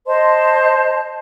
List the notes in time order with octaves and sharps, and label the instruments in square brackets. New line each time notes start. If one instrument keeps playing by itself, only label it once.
[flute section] C5 D#5 A5 C6